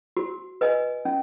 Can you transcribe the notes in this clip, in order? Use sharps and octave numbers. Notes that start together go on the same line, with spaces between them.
F#4
B4 D#5 G#5
C#4